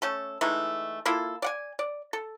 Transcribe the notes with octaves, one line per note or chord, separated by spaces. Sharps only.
A3 C#4 A4
E3 G#3 A3 D#4
A#3 E4 F4 A4
D5 F#5 G#5
D5
A4